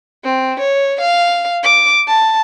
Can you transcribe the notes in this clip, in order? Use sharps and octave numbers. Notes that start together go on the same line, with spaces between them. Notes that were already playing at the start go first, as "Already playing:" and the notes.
C4
C#5
F5
D6
A5